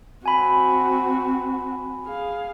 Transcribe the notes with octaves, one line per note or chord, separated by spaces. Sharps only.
C4 F#4 G#5 B5
G#4 F5